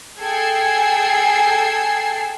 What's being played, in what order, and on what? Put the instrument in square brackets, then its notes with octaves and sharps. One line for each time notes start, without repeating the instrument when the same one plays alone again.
[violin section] G#4 A4 G5 E6 G#6 C7